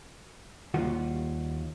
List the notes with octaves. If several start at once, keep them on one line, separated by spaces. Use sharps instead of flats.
D#2 G3 F4 F#4